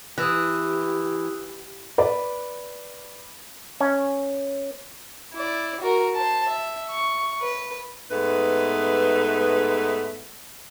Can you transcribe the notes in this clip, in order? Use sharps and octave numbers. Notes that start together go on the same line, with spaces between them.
E3 G4 D#6 E6 F#6
B4 D5
C#4
E4 D5
F#4 A#4
C5 A5
E5
C#6
B4
G#2 A3 B3 D#4 B4